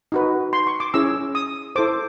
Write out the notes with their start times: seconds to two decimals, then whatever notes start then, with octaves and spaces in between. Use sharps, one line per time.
0.12 D#4 F#4 B4
0.53 C6
0.67 C#6
0.80 D6
0.94 C#4 E4 G#4 C#5 E6
1.35 D#6
1.76 E4 A4 C5 D6